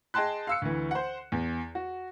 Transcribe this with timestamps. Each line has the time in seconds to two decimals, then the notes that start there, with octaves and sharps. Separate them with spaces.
0.14 G#4 D#5 G5 A5 C6 F#6
0.47 F5 E6 C#7
0.62 D2 E3
0.91 C5 F#5
1.32 E2
1.75 F#4